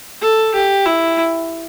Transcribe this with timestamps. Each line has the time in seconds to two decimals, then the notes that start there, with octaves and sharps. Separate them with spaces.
0.21 A4
0.54 G4
0.86 E4